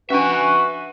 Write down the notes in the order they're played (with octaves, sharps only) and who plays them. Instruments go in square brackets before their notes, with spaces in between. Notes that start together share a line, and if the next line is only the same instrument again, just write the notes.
[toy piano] C#4 D4 [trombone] F#4 [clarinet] B4 [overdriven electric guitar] E5 G#5